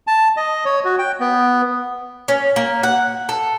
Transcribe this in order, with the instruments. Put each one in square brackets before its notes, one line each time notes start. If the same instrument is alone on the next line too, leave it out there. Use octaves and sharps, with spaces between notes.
[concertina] A5
D#5
C#5
F#4
G5
B3
[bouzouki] C#4
A#3
F#5
A4